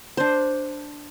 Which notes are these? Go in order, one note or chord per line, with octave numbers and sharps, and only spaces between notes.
D4 C5